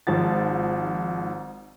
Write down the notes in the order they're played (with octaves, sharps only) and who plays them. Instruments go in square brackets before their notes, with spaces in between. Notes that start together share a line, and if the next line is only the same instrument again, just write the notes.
[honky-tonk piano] G#1 G#2 F3 A6